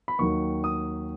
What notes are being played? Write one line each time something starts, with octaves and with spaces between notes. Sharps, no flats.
B5
D#2 D#3 F#3 C#6
D#6